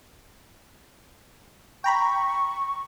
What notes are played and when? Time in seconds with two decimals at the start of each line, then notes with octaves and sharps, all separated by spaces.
1.84 G5 A#5 B5 C#6